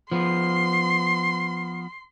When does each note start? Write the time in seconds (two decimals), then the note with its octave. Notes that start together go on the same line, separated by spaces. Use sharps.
0.12 F3 B3 C6